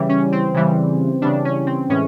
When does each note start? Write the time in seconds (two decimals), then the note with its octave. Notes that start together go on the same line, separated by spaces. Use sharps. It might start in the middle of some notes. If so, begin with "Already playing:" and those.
Already playing: C#3 E3 G3
0.09 C#4
0.32 C4
0.54 C#3 E3 G3
1.22 C#3 E3 G3 D4
1.45 C#4
1.66 C4
1.89 A2 E3 G#3 C#4